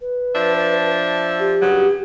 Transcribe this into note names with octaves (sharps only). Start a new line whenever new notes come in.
B4
F3 D4 E5
G4
G2 C#3 F#3